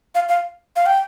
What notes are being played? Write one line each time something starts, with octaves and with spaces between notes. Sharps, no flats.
F5
F5
F5
G5